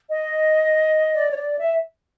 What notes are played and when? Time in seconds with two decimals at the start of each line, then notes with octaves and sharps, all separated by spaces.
0.08 D#5
1.14 D5
1.31 C#5
1.36 D5
1.60 E5